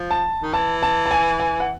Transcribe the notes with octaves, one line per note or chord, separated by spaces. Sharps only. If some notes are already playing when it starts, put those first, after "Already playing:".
Already playing: F3
A5
D#3
E3 A5
A5
A5
G#5
G#5
F#5